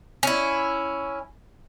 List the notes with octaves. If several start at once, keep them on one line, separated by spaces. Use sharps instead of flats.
C#4 E4